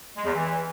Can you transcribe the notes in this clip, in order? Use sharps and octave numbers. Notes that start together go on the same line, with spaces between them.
G#3
E2
E3